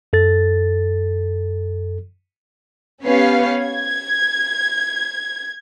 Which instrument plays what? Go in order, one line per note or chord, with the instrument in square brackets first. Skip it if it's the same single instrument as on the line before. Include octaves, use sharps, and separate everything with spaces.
[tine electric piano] F#2 A4 A6
[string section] B3 C#4 G4 B4 C#5 F5
G#6